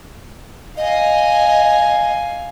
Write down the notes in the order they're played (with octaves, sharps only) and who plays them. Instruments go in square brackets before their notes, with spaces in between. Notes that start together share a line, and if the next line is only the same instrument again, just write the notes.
[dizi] D#5 [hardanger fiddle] F5 G#5